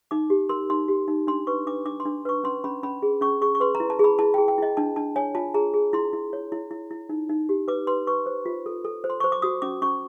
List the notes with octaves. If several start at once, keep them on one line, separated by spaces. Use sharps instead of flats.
D#4 D6
G4
A#4 C6
D#4 C6
G4
D#4
D4 C6
B4 C#6
D4 D6
D4 D6
C6
D4
B4 C#6
C#4 C6
C#4 B5
C#4 B5
G#4
C#4 C#6
G#4 C#6
C#6
B4 C6
A#5
E4
A5
G#4 B5
E4 A5
G5
G#4
G5
E4 D#5
D4 A5
D4 A5
C#5 G#5
F4 A5
G#4 A#5
G#4
E4 C6
E4
C#5
E4
E4
E4
D#4
D#4
G4
B4 D6
B4 C6
B4 C#6
C5
F4
A4
A4
C5
C6
C5 C#6
D6
F#4 D#6
C#4 D6
C#4 C#6